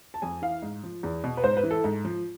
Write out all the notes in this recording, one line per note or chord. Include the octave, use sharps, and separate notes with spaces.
A5
F2 G#5
E3 F5
G#2
F3
E2
B2
B4
G#2 C5
B4
E3
A4
G#2
F3